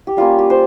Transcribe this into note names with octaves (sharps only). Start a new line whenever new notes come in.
G4
G3 A#3 C#4 F4
G4
C5